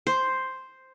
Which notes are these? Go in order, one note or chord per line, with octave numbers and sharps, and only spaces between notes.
C5